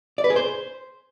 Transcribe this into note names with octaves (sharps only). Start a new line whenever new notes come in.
D5
B4
G#4
C5